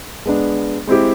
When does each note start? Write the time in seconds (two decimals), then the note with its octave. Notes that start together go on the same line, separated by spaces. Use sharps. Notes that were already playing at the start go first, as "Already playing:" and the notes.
0.26 G#3 B3 D4
0.87 G#3 C4 E4 G4